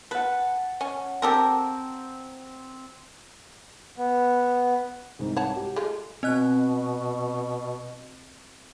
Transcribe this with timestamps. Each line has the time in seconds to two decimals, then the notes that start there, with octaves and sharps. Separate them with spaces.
0.11 B4 F#5 A5
0.81 C#4
1.22 C4 G4 A4 A#4
3.98 B3
5.19 C2 G#2
5.36 C#5 F#5 A5
5.56 G4
5.76 G#3 A3 F4
6.23 B2 C4 D#5 F#6